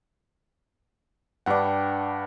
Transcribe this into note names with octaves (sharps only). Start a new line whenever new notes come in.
G2 D4 B4 F#5 G5